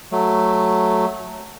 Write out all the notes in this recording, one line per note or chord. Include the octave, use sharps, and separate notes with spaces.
F#3 A3